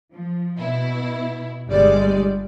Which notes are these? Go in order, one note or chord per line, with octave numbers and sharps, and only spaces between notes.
F3
B2 E4
G1 G3 G#3 D5